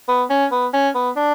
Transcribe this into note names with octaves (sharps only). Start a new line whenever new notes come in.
B3
C#4
B3
C#4
B3
D4